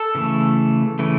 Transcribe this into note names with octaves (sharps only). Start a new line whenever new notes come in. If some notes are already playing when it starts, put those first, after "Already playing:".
Already playing: A4
C#3 E3 A3
C#3 E3 A3